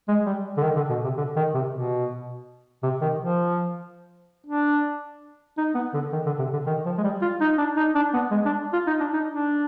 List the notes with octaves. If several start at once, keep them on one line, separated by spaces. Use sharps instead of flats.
G#3
G3
D3
D#3
D3
B2
C3
D3
D#3
C3
B2
C3
D#3
F3
D4
D#4
B3
D3
D#3
D3
C3
D3
D#3
F3
G#3
G3
F4
D#4
D4
D#4
D4
B3
G#3
D4
F4
D#4
D4
D#4
D4